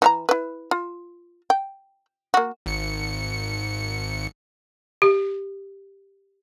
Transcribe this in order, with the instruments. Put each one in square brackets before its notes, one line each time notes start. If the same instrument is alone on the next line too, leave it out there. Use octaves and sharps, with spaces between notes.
[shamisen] E3 F4 A#5
E4 B4
F4
G5
A#3 F#4
[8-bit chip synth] G#1 C#7
[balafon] G4